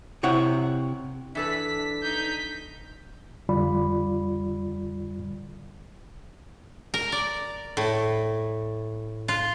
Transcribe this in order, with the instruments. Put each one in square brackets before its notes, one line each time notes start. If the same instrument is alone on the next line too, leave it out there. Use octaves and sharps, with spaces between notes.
[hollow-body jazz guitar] C3 E4 C#5 F#5
[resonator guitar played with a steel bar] E3 A4 B4 [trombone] D4 [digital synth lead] B6
[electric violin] D#4 G6
[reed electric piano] F2 D3 G3 F4 D5 B5
[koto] A#4
D5
A2
F4